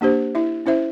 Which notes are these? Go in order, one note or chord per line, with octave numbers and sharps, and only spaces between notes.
A#3 D4 G4 C5
E4 E5
C#4 E4 C5 E5